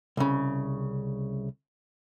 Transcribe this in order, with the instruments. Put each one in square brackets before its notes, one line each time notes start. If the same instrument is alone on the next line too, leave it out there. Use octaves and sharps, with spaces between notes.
[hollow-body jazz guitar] C2 C#3